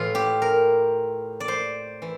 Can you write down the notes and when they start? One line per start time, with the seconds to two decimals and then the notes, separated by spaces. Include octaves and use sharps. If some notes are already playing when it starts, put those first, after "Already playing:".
Already playing: A2 E3 F4
0.15 G4
0.42 A#4
1.40 D5
1.48 C5
2.02 E3